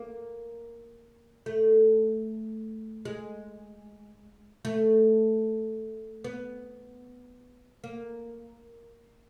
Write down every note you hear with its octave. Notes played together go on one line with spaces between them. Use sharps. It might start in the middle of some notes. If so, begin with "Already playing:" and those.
Already playing: A#3
A3
G#3
A3
B3
A#3